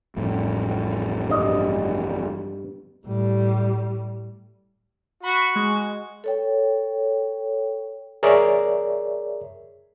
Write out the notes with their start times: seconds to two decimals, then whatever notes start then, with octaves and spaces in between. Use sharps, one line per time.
0.17 A1 F2 A2
1.30 G2 D#5
3.07 A2 G3
5.23 F#4 B5
5.56 G#3
6.24 A4 C#5 G5
8.23 G#4 A#4 C#5 D5 E5